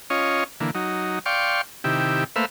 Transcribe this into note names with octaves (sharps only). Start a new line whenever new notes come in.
C#4 F4 C#5 D#5
D3 E3 A#3
F#3 D#4
D5 F5 G5 C6 C#6
C3 D#3 E4 G4
A3 A#3 B4 C5 E5 F5